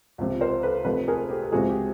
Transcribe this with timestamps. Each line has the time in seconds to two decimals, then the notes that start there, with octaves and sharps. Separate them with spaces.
0.18 C#2 C3 F3
0.41 A#4 C5
0.63 A4 B4
0.85 F1 F2 C3 A4 B4
1.08 G#4 A#4
1.29 G4 A4
1.43 A4
1.52 C#2 C3 F3 G#3 F#4 G#4
1.69 G4